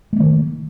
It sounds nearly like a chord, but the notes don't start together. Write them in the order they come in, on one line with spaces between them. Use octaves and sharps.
A3 A#3 D#3